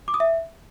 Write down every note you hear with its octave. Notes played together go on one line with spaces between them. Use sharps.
D6
D#6
E5